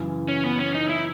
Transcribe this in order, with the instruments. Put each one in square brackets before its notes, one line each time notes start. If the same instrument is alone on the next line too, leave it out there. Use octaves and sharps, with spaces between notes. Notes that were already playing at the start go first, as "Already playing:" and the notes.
Already playing: [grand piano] F#2 C#3 E3
[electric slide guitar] C#4
B3
C#4
D#4
E4